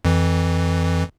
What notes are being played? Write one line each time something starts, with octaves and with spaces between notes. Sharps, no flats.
F2 E3